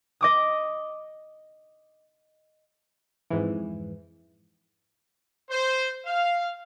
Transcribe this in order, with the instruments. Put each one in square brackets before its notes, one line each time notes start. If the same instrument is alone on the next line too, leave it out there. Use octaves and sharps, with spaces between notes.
[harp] D#5 D6 D#6
[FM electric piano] F2 G#2 E3
[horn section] C5
F5